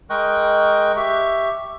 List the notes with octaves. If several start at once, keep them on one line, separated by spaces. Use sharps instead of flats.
G#3 A#4 D#5 G5 C#6 F#6
G4 E5 C#6